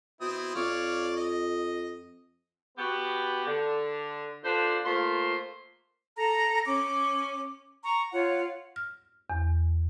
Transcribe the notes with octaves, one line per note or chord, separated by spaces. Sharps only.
B2 C4 E4 D#6
F2 C#5 D5 F5
D#5
B3 F#4 G4
D3
D3 D4 F4 B4 C5
A3 A#3 F4 C5 C6
A4 A#5
C#4 D6
A#5 C#6
F4 C#5 F5 F#5
F6
E2